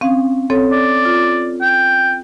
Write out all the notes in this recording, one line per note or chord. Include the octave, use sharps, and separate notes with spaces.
C4 C#4 F5
C4 A4 C#5
D5
F4
G5